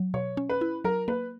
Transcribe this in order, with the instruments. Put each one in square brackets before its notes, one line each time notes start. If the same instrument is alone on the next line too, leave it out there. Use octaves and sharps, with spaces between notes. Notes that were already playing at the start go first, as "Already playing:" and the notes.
Already playing: [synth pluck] F#3
[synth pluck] B2 [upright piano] C#5
[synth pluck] C#4
[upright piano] B4
[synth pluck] E4
[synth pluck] F#3 [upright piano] A#4
[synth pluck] A#3 [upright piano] B4